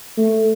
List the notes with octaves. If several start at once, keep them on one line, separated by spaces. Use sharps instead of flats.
A3